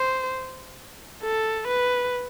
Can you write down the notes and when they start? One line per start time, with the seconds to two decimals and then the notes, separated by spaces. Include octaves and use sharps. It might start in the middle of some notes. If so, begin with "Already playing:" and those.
Already playing: C5
1.23 A4
1.67 B4